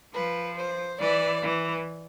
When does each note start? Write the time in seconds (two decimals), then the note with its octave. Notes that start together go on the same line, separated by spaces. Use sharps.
0.14 F3 B4
0.57 C5
1.00 E3 D5
1.42 E3